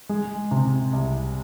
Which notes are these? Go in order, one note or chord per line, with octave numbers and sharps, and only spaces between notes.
G#3
C3
C2